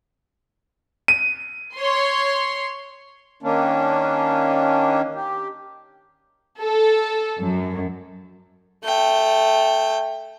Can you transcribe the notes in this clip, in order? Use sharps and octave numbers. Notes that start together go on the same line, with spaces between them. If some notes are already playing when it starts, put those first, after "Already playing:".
D#7
C#5 C6
D#3 A#3 C#4 D4
G4
A4
F#2
A3 G5